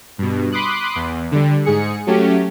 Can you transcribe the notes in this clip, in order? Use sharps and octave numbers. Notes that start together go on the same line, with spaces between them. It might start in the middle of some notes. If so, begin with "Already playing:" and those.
G2 B2
B5 C6 D6 D#6 F#6
E2
D3 G3
G#2 G#4 C#7
F#3 A3 C#4 G4